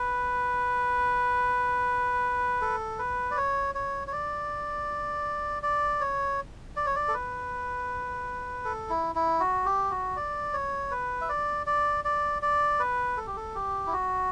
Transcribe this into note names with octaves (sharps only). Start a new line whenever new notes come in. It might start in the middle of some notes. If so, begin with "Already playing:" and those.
Already playing: B4
A4
B4
D5
C#5
C#5
C#5
D5
D5
C#5
D5
C#5
D5
A4
B4
A4
E4
E4
F#4
G4
F#4
D5
C#5
B4
E5
D5
D5
D5
D5
B4
A4
G4
A4
G4
E4
F#4